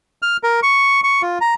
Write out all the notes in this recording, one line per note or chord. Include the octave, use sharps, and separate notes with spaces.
F6
A#4
C#6
C#6
F4
A#5